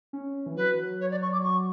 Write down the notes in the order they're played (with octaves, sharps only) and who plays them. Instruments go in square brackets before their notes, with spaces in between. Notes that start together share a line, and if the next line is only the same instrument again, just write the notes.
[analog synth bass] C#4
E3
[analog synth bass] F#3 [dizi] B4
[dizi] C#5
D5
C#6
D6
C#6